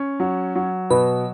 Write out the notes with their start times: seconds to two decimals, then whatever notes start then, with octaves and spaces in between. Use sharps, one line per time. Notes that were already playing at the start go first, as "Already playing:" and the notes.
Already playing: C#4
0.20 F#3
0.56 F#3
0.90 B2 B4